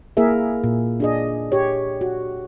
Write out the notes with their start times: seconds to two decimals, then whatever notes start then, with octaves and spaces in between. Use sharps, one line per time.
0.17 A#3 E4 G#4 A#4 E5
0.64 A#2
1.00 D4 G#4 D#5
1.52 G4 C#5
2.01 F#4